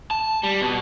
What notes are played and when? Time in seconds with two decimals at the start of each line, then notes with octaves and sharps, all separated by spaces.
0.11 A5
0.43 G3
0.61 B2